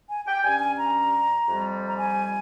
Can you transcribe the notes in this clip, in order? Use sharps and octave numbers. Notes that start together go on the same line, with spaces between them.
G#5
G5
G2 G3 C#4 G#5
G#5
A#5
F2 C3 G3
A#5
G#5